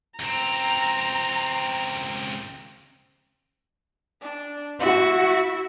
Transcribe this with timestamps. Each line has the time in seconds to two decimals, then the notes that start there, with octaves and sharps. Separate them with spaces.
0.19 C#2 C4 A#5
4.21 D4
4.80 E4 F#4